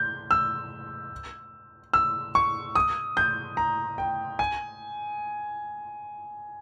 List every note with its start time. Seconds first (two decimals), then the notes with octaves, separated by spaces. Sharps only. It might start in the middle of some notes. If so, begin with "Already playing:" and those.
Already playing: G6
0.31 E6
1.93 E6
2.35 C#6
2.75 D#6
3.17 G6
3.57 A#5
3.98 G5
4.39 G#5